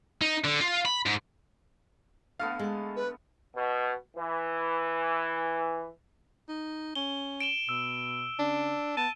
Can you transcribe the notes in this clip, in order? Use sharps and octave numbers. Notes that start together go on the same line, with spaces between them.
D#4
D3
F4
B5
G#2
D3 A3 B3 F5 F6
G#3
B4
B2
E3
D#4
C#4 G7
D7 E7 G7
B2 E6
C#3 D4
B3 A5 D#7